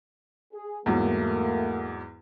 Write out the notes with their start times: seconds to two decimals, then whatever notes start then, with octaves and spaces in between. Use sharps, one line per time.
0.53 G#4
0.86 E2 G#2 F#3 A3 A#3